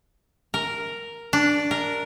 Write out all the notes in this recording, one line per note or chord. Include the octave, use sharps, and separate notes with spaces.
A#4
D4
A#4